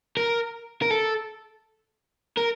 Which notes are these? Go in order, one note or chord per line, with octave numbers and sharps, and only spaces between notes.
A#4
A#4
A4
A#4